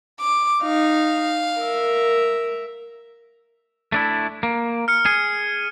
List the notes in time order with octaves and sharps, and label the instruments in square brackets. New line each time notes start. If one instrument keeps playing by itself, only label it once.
[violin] D6
[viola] D#4 [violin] F5
[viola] A#4 E5
[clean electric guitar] A3 D4 E4
A#3
[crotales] F6 C#7
[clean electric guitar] G#4